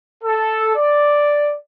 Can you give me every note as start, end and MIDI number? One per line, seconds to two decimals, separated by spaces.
0.24 0.72 69
0.76 1.57 74